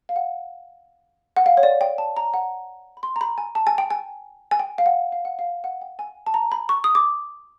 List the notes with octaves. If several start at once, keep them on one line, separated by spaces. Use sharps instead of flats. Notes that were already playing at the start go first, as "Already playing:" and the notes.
F5
F#5
F#5
F5
C#5
D5
G5
A5
A#5
F#5
B5
C6
A#5
B5
G#5
A5
G#5
G5
G#5
G#5
G5
F5
F#5
F5
F#5
F5
F#5
G5
G#5
A5
A#5
B5
C#6
D#6
D6